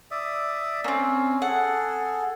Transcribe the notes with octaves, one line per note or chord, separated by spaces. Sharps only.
D5 E5 D#6
A#3 C4 C#4
G#4 A4 F#5